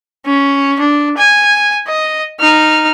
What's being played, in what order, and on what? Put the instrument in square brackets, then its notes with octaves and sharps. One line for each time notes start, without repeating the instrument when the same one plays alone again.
[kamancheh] C#4
D4
G#5
D#5
D#4 F6